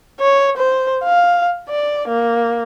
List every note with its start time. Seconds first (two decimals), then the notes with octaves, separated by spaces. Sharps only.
0.20 C#5
0.57 C5
1.04 F5
1.69 D5
2.08 A#3